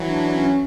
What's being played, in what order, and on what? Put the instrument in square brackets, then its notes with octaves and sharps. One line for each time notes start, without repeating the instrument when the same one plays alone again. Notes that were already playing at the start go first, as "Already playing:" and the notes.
Already playing: [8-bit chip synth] E3 F#3
[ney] D4
C#4